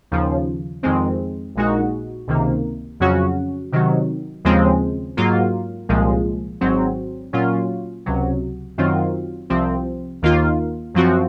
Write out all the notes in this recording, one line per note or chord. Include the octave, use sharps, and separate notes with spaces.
D#2 C#3 F3
F2 D#3 G#3 C4
A#1 A#2 G#3 D#4 F#4
C#2 C3 D#3 A#3
F2 C#3 F#3 C#4 F#4
C3 D#3 F#3
D#2 C#3 F3 G#3 C4
G#2 F#3 A#3 F4
C2 A#2 F3 G#3
G#1 G#2 F#3 C4
A#2 F#3 C#4 F4
C#2 C3 F#3
F#2 D#3 F#3 C4 F4
C2 C3 F3 C4
D#2 D#3 A#3 F4
F#2 F3 C4 F#4